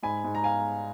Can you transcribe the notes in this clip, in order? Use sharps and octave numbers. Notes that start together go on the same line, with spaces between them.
G#2 G#5 B5
G#2
A#5
F5 G#5